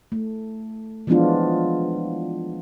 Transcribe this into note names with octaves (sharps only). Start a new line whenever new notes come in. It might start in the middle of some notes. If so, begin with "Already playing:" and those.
A3
E3 F3 G#3 B3 D4 F4